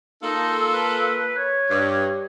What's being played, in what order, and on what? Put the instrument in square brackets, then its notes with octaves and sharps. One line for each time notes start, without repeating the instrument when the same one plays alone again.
[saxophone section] A#3 F4 A4 [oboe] D#4
[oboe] B4
C#5
[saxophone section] G2